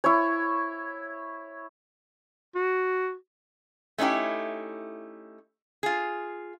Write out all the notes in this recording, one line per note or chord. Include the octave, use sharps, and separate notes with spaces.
E4 C#5
F#4
A3 C#4 D#4 E4 G4
F4 G#4